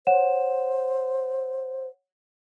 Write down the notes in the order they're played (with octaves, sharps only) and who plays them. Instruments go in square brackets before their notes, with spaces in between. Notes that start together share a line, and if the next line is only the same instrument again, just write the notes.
[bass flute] C5 [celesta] C#5 F#5 E7